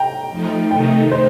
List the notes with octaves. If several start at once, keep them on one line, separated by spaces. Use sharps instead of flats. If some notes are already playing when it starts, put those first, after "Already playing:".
Already playing: G5 A#5
F3 A3 D#4
C3 D#3 A3 D#4 G5
C5